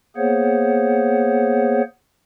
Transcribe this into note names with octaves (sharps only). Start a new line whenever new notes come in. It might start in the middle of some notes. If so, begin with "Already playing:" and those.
A#3 B3 G#4 C5 C#5 F#5